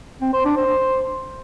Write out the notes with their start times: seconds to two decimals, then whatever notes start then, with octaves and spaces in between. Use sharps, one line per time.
0.21 C4
0.33 C5
0.45 D4
0.57 C5